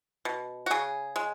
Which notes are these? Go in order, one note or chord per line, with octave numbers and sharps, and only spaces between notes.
B2
F#4
C#3 G#4
G#3